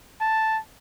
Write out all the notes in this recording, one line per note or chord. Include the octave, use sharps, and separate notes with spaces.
A5